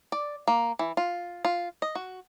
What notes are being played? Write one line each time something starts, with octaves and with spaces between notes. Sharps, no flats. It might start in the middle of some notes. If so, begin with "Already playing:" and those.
D5
A#3
E3
F4
F4
D#5
F#4